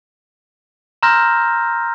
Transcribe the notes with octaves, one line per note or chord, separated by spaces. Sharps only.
A#5 C6 E6 F6 G6 A#6